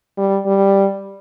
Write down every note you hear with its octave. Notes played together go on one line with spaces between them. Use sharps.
G3
G3